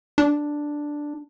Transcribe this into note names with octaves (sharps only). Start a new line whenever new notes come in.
D4